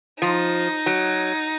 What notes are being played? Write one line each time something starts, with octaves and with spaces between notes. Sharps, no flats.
F3 D#4
F#3